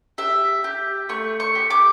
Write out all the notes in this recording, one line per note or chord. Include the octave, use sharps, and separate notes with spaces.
G4 E5
G4
A3 C#6
C#6
G4
D6